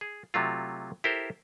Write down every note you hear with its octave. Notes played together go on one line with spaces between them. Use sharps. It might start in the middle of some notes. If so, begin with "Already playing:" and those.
G#4
C3 F#3 A3 F4
E4 G4 A4 A#4 C5